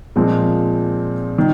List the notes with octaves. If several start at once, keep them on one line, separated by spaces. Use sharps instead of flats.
A#2 F3 G#3 C4
D#3